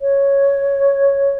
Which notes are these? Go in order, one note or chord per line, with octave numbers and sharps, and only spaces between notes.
C#5